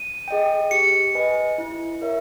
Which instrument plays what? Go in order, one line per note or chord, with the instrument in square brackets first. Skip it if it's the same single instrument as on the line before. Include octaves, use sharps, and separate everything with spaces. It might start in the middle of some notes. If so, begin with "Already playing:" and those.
Already playing: [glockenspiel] D#7
[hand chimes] G#4 D#5 G5
[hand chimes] G4 [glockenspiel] C#7
[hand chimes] B4 D#5 G#5
E4
A#4 C#5 E5